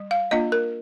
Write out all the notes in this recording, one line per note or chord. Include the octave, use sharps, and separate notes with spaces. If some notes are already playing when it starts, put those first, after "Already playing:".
Already playing: G3
F5
A#3 D4 F4 D#5
A#4